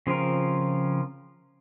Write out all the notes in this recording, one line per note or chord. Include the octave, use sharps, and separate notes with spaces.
C#3 F3 C4 F4 A#4